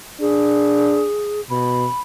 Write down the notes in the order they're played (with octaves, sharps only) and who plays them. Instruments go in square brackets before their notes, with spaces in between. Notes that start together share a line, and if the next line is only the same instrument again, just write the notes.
[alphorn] D4 [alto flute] G#4
[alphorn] B2 [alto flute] B5